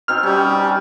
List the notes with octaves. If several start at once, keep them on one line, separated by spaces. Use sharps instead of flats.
B2 C4 D#4 F6
G3 C#4